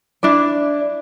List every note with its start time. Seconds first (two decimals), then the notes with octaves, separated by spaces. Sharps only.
0.23 D4 E4 D5